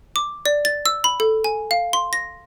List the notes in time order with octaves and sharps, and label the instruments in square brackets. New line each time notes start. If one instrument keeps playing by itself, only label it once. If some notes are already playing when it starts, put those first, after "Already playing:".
[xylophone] D6
D5
A6
E6
B5
A4
G#5
F5
C6
A#6